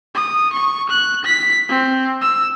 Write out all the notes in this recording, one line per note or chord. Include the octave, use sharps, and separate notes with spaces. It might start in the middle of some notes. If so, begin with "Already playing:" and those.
D#6
C#6
F#6
B6
C4
E6